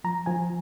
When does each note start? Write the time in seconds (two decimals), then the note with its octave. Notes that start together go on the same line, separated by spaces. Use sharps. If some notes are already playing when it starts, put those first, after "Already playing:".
0.04 F3 A#5
0.26 F3 G#5